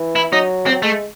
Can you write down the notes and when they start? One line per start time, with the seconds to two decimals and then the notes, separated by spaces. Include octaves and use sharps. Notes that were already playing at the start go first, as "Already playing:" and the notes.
Already playing: E3
0.16 E4
0.32 F#3 D#4
0.66 C4
0.72 F#3
0.82 G#3 A3